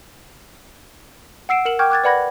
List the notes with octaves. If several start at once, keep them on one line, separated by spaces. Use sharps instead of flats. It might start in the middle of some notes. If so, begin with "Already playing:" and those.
F#5 E6 C7 D7 E7
A#4 C#7 E7 F#7
G5 C#6 D6 F6 G6 G#6
D6 F#6 G#6 A6
B4 D5 F#5 B5 G#6 A#6